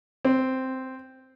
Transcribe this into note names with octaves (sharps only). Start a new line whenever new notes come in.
C4